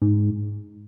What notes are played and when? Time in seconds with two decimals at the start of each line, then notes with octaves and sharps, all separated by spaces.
0.02 G#2